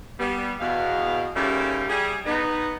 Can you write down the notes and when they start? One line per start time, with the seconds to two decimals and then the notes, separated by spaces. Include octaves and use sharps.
0.19 G3 B3
0.60 E2 B2 F5
1.35 D#2 C#3 G3 A3 F4 G4
1.89 G3 G#4
2.26 B3 D#4